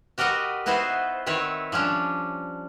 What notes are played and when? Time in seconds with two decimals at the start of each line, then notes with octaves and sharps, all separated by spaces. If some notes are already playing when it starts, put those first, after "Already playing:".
0.18 F#4 G4 A#4 B4 D#5 F#5
0.66 B3 D#4 E4 F#4 B4 C5
1.26 D#3 C4 E4 B4 C#5
1.72 F3 G3 C#4 D4